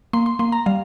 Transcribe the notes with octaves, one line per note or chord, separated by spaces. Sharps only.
A#3 C6
C6
A#3 C6
A#5
G3 F5